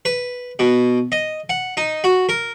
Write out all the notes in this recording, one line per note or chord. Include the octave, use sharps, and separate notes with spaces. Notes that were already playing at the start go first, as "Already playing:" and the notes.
B4
B2
D#5
F#5
D#4
F#4
A#4